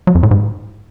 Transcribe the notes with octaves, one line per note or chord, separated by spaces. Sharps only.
F#3
F2
A2
G#2